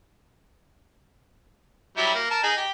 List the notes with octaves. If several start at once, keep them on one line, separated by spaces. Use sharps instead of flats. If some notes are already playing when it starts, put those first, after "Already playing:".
F#3 G3 E4
A#3
A#4 A5
D#4 G#4
G4